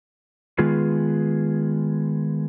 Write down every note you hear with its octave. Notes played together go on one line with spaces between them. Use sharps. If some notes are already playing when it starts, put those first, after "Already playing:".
D#3 G#3 B3 F4 G#4 B4